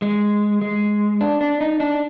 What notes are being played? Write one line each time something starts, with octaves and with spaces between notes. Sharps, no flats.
G#3
G#3
D4
D4
D#4
D4